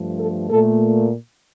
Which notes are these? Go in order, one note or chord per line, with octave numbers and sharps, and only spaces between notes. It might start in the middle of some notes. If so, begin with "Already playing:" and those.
Already playing: G2 F3 A3
A4
A#2 A3 A4